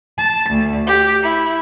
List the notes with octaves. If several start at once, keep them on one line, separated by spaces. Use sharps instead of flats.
A5
D2
G4
E4